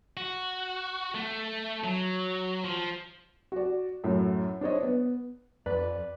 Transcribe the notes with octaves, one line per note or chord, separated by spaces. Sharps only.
F#4
A3
F#3
F3
F#4 D5
F#2 A2
D4 C5 C#5 D#5
B3
F2 B4 D5